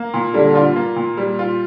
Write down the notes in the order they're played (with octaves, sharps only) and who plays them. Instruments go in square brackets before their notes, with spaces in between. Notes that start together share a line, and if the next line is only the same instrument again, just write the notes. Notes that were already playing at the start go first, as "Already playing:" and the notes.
Already playing: [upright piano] A#3
A#2
[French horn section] D3 [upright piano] G3
[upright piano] F4
A#3
A#2
G3
F4